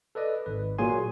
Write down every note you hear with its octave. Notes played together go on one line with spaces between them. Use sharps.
A4 B4 D5 D#5
G#1 B4
A#2 F#3 A#3 G#4 G#5 C6